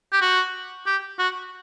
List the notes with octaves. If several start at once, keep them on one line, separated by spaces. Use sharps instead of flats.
G4
F#4
G4
F#4